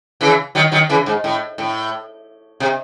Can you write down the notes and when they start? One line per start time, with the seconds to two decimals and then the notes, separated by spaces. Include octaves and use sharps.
0.21 C#3 E3
0.55 D#3 F#3
0.72 D#3 F#3
0.89 C#3 E3
1.06 G#2
1.24 A2
1.58 A2
2.60 C3